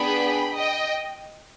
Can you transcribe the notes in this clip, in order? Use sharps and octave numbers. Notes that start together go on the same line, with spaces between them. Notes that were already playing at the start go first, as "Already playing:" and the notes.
Already playing: B3 D4 G#4 G5 B5
D#5 G5